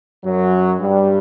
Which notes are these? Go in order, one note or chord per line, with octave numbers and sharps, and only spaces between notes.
F#2 F#3
G2 G3